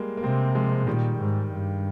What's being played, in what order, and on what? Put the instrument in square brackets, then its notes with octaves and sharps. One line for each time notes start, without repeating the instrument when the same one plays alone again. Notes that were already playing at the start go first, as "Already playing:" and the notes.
Already playing: [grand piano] G3 G#3 A#3
A#3
[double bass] C3 [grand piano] G#3 C4
[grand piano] F3 G#3
[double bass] A#2 [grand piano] D#3 G3
[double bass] G#2
G2